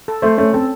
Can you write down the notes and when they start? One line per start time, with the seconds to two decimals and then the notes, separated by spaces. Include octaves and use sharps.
0.08 A4
0.22 A3 C5
0.38 A3 C#4
0.53 C4 A4